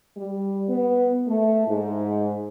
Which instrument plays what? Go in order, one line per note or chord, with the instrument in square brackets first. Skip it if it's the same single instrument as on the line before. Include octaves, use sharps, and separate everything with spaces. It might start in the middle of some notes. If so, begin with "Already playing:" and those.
[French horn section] G3
B3
A3
G#2